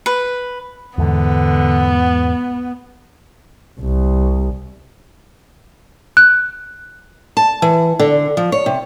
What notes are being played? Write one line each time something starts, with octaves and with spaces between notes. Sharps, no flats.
B4
E2 G#2 D3 B3
C2
F#6
A5
E3
D3
F3
C#5
C3